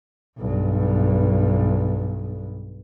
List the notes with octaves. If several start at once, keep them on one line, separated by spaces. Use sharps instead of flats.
B1 G2